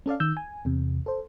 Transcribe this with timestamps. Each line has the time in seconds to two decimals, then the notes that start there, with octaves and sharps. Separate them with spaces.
0.06 C#4 A4 D5 F5
0.20 D#3 E6 G6
0.37 G#5
0.65 E2 C3
1.06 A4 C5